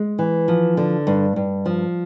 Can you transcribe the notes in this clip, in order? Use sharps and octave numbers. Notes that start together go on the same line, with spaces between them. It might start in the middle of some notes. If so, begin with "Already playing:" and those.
Already playing: G#3
E3
F3
D3
G2
G2
F3